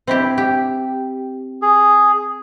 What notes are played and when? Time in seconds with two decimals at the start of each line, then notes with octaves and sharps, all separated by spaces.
0.07 C4 E4 G4
0.38 G4
1.62 G#4